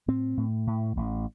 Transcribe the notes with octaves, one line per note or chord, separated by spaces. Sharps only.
A2 C4
A2
A2
A1